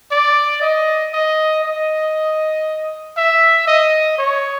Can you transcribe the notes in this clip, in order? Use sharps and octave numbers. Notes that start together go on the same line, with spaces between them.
D5
D#5
D#5
D#5
E5
D#5
C#5